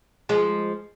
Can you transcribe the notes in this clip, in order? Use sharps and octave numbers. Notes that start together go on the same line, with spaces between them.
F3 G#3